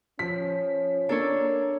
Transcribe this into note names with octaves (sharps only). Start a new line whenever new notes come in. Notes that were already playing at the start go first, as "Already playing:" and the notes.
F3 C#4 B6
A#3 D4 A4 C#5